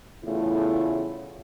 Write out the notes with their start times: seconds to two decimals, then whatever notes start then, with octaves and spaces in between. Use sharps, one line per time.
0.24 E2 A2 C#3 A3 E4 F4